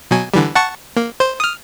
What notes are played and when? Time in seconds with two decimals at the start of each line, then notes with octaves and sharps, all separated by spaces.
0.11 B2 F#3 G#5
0.34 D3 E3 G3
0.55 F#5 A5 C#6
0.97 A#3
1.20 C5
1.40 D#6 F6